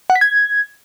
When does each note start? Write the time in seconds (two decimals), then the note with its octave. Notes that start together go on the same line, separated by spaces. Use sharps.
0.10 F#5
0.15 B6
0.21 G#6